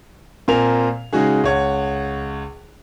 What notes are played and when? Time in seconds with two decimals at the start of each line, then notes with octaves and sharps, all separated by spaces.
0.48 A#2 C4 A#4 G#5 F7
1.13 C#3 G#3 D#4 F#4 G#4
1.44 C#2 C#5 F#5